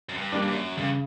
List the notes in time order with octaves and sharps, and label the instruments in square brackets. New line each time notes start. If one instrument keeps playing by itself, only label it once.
[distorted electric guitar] F#2
G2
[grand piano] G3 A#3 D4
[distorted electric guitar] G2
F#2
[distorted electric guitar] G2 [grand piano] C#3